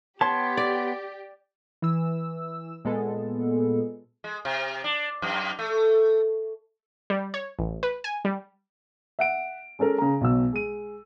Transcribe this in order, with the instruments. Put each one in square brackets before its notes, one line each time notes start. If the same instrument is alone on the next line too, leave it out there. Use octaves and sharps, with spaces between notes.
[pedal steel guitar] B3 C#5 C6 [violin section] G4 [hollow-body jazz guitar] A5
[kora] D5
[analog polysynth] E3 E6
A#2 G#3 B3 A4
[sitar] G#3
C3
D4
F#2
A3
[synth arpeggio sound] G3
C#5
A1
B4
G#5
G3
[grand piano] E5 F#5 D7
G#3 C#4 A4 A#4
C#3 A#5
B1 B2 F#3 E6
G#3 D#7